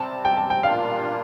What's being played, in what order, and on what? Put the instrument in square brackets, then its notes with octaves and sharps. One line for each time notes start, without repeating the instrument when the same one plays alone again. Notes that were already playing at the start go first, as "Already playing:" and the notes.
Already playing: [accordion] C3 G3 C4 [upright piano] A5
[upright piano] G5
A5
G5
[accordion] A#2 G3 A#3 D4 F4 [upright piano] F5